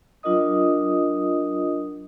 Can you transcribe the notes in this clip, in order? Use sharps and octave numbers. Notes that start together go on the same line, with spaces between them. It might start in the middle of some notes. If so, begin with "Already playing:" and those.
F#3 D4 F4 A#4 D#5 D#6